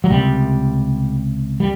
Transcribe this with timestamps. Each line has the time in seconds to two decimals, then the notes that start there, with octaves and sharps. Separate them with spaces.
0.04 F#3
0.10 C#2 C3 G3
1.60 G3